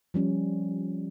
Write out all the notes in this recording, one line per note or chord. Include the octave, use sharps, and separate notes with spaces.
F3 G3 C#4